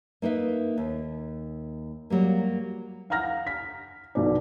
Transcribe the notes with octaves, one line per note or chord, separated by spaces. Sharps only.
A#3 D#4 B4 E5
D#2
F#3 G3 A#3
F5 F#5 A#5 F6 A#6
B6
B1 B2 D5